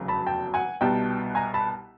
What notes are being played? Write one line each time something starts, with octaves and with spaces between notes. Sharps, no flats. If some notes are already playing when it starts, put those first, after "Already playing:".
Already playing: F1 E2 C#3 F#3
A5 B5
G5 A5
F#5 G#5
C2 B2 G3 B3 D#4 G5 A5
G#5 A#5
A5 B5